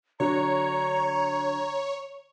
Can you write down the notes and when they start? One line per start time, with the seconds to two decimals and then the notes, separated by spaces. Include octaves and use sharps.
0.20 D3 F#3 D4 C#5 A#5